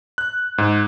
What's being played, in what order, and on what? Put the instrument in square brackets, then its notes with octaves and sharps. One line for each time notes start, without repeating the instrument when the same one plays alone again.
[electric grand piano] F#6
G#2